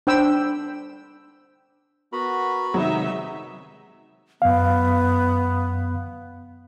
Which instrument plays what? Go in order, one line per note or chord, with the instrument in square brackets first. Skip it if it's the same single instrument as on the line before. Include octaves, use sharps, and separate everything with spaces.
[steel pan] D4 C5 G5 B5 E6
[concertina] B3 F#4 B5 [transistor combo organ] A#4
[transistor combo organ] C3 D#3 G#3 [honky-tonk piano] F#3 [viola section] D#4 E5
[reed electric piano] F#2 F5 [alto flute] B3